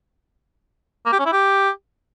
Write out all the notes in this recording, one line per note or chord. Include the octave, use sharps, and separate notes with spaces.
A#3
G4
C#4
E4
G4